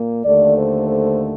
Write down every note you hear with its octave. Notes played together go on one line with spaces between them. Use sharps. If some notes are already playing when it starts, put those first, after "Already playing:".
Already playing: A#2 A#3
D#2 D3 A3 D5
C5
C5